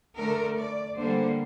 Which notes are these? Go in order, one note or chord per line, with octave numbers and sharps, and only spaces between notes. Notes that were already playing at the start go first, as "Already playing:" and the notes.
D3 A3 A#4
D5
D3 G3 A#3 C5